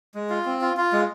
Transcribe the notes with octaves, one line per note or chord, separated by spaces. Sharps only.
G#3
F4
C4
F4
F4
G#3